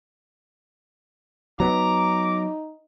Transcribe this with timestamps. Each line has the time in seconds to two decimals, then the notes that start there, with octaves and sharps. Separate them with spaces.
1.60 F#3 B3 D#4 A#5 D6